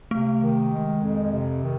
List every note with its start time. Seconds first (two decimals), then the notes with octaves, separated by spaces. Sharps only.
0.11 C3 A3
0.42 D#3
0.72 G#3
1.02 F2
1.32 C3
1.63 D#3